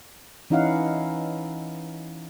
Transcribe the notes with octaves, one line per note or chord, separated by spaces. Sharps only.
E3 C#4 D#4 E4 F5 F#5